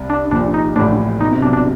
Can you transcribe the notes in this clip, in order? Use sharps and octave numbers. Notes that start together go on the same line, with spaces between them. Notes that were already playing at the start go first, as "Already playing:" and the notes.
Already playing: C2 C3
D4
A#1 A#2 D4
D#4
A1 A2 D4
B2 D#4
C3
B1 B2 D4
D4
C3